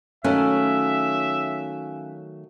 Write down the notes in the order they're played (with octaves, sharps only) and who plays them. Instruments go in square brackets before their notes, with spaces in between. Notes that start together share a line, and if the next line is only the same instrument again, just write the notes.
[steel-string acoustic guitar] D#3 F#3 A3 [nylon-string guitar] C#4 [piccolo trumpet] E5 [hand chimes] F5 G#5 F#6